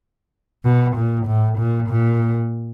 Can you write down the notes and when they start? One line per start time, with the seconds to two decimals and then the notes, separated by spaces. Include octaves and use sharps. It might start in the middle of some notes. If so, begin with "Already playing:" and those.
0.65 B2
0.96 A#2
1.27 A2
1.58 A#2
1.90 A#2